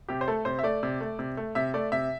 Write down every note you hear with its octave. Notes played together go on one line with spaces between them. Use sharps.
C3 G4
C5
A3 A4
C3 C5
E5
A3 D5
C3
A3
C3
A3
C3 E5
A3 D5
C3 E5